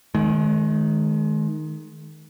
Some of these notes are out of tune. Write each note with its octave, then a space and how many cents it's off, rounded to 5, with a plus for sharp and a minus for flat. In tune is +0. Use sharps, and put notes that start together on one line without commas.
D#3 +0 G#3 +35